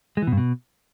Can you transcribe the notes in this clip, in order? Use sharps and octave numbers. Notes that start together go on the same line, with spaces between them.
G#3
E3
B2
G2
B2